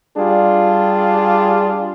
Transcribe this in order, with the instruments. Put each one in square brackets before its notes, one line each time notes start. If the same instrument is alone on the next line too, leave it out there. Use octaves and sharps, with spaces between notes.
[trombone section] G3 D4 F4 G#4